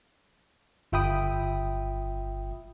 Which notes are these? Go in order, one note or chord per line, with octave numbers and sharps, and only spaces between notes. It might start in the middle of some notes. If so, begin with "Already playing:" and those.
G1 F4 E5 G5 B5 D#6